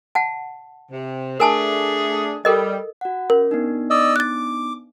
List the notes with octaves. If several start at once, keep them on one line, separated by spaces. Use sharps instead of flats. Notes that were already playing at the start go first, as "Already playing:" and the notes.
F#5 A5
C3
A3 D4 G#4 A#4 G#5 A5
G3 A4 A#4 D#5
F#4 F#5
C#4 A#4
B3 D4 D#4
D5 D#5 E6
D6 F#6 A6